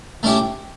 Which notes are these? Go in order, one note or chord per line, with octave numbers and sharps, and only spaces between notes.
A3 C#4 E4 G4